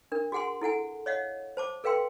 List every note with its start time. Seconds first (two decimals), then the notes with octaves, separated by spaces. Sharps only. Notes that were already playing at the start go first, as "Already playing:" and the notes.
0.12 D4 A#4
0.32 F#4 G#4 F#5 G#5 C6
0.62 E4 A4 F#5 G#5
1.06 C#5 D#5 F5 F#5
1.57 C5 A5 D6
1.84 A4 B4 F5 G5 C6